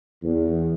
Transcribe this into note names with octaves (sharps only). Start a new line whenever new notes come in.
E2